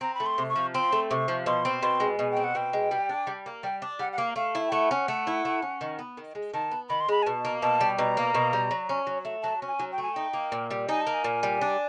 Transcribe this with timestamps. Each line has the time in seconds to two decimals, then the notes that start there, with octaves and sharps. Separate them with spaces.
0.01 C4 A#5
0.15 B5
0.20 A3
0.26 C6
0.38 C3
0.50 C#6
0.56 F3
0.74 C4 C6
0.92 A3
1.11 C3 C#6
1.28 F3
1.46 B2 C6
1.65 C4
1.82 B2 C6
2.00 G#3
2.19 B2 G#5
2.31 G5
2.37 C4
2.44 F#5
2.55 B2 G5
2.73 G#3
2.91 G3
3.09 D4
3.27 G3
3.46 A#3
3.63 G3 G5
3.82 D4
3.99 G3 F#5
4.12 F#5
4.18 A#3 F5
4.36 A3 F5
4.55 E4
4.68 G5
4.72 A3 F#5
4.91 C#4
5.08 A3
5.27 E4
5.45 A3
5.62 C#4
5.81 D#3
5.99 B3
6.17 D#3
6.35 G#3
6.54 D#3 A5
6.71 B3
6.89 D#3 B5
7.01 C6
7.09 G#3 B5
7.23 G#5
7.26 B2 A5
7.45 A#3
7.62 B2 A5
7.81 G3
7.98 B2 A#5
8.17 A#3
8.35 B2
8.53 G3
8.71 F#3
8.89 C#4
9.07 F#3
9.25 A3
9.43 F#3 A5
9.62 C#4
9.68 G#5
9.79 F#3
9.92 G5
9.98 A3 G#5
10.14 D#4 G5
10.33 A#3
10.52 A#2
10.71 G3
10.89 D#4 G#5
11.01 A5
11.07 A#3
11.14 G#5
11.24 A#2
11.43 G3
11.61 D4